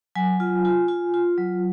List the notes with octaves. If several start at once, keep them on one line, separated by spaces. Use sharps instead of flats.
F#3 G#5
F4
F4
F4
F4
F#3